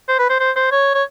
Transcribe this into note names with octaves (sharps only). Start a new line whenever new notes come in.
C5
B4
C5
C5
C5
C#5
C#5